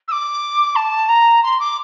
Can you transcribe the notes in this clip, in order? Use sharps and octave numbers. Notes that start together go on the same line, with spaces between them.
E6
D6
A5
A#5
C6
D6